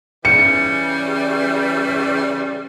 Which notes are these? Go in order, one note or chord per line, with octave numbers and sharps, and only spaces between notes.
C#3 E3 G3 C#7